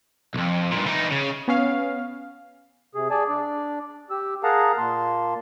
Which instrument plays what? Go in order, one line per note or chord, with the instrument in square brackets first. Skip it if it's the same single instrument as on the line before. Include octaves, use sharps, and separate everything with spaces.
[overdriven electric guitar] B1 F2
G2 A#2
E3 D#4
C#3
[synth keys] B3 C#4 F5
[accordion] C3 G#4
G#4 D5 G#5 A5
D4 D5
G4 E6
G#4 A#4 F5 F#5 A5 A#5
A#2 A#3 A5 C6